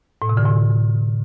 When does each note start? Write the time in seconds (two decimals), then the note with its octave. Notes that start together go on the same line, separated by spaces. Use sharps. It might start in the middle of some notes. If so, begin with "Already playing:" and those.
0.22 A2
0.29 C3
0.37 D3
0.45 A2